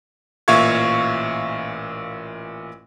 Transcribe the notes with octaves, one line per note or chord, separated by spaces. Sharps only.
A1 A#2 E5 F5 C#6 G#6